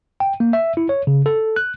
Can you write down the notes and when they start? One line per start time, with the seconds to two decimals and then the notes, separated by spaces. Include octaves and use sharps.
0.20 G5
0.40 A#3
0.53 E5
0.77 E4
0.89 C#5
1.07 C#3
1.26 A4
1.56 F#6